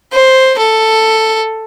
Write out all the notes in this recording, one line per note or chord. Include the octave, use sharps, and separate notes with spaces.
C5
A4